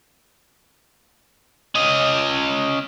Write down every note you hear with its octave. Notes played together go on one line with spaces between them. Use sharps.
C#4 D#5